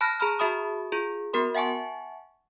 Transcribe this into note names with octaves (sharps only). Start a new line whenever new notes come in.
A5 B5 F6 F#6 A#6
G#4 A#5 B5 F6
F#4 G#4 E5 A5 B5 D#6
F4 G#4
B3 F#4 A#4 C6
E5 F#5 G#5 A5 C#6